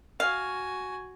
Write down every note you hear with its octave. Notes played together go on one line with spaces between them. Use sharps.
F#4 F5 G#5